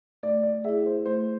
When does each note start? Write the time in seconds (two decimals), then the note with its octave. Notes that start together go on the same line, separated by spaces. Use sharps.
0.23 A3 D5
0.43 D5
0.64 E4 G#4 E5
0.86 C5
1.06 A3 C5